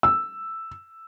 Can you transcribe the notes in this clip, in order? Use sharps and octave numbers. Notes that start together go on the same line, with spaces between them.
E6